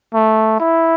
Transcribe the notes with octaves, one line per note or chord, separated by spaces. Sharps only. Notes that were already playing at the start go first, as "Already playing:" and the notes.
A3
E4